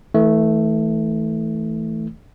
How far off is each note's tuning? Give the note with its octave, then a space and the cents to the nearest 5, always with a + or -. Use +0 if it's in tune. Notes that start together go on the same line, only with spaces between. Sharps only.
E3 -30 A3 +0